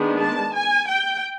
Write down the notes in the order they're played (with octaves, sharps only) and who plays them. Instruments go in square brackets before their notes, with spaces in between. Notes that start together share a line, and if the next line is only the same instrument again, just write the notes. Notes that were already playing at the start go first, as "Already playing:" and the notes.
Already playing: [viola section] D#3 G#3 B3 D4
A5
G#5
G5